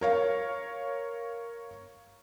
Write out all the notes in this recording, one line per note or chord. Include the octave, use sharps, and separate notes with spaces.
A#4 C#5 F5